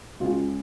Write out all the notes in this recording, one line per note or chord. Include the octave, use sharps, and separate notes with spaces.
C#2 C#3 G#3 F4